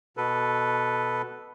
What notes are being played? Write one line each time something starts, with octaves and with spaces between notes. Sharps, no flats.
B2 A4 B4